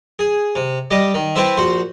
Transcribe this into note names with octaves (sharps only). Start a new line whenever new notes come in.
G#4
C3
G3 G4 D#5
D#3
C4 E4 G4 B4 C5 E5
A#1 F#4 C5